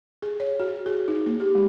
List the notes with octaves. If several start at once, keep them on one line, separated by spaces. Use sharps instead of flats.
G#4
C#5
F#4
G#4
D#4
A#3
G4
G#3